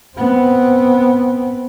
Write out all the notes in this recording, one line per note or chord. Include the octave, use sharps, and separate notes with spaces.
B3 C4